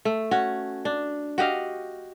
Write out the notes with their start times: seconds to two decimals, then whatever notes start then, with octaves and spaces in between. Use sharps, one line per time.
0.05 A3
0.31 C#4 F#4
0.85 D4
1.38 F#4 G4 D#5 F5